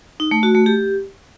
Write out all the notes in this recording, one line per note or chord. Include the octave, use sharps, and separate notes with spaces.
D#4
A3
F#4
A3
G4